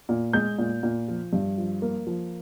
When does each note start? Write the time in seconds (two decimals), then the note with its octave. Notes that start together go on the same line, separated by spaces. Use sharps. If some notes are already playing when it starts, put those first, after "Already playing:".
0.09 A#2
0.33 G#3 G6
0.58 A#2
0.83 A#2
1.08 F3
1.33 G2
1.58 F3
1.82 A#3
2.07 F3